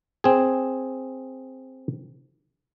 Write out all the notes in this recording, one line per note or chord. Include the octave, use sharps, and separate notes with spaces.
C4 G#4